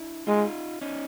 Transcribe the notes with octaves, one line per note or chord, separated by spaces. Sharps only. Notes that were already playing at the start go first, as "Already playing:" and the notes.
Already playing: D4 E4
G#3 D#4 F4
C#4 D#4